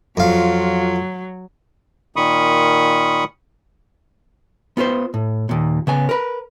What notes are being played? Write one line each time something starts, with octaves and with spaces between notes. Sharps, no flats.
F2 F#3 F4 F5
A#2 D#3 B5 C#6 D#6
B3 F4 B4 C5
A2
D#2 A#2
C#3 B3 G#5
A#4 B4